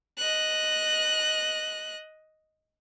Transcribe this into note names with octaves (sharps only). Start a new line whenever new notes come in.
D#5 F#6